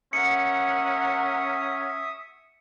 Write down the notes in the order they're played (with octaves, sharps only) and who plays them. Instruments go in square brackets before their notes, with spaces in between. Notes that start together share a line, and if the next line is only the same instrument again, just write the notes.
[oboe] C#4 [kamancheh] A#4 F#5 [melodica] E5 D#6 [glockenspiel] C#7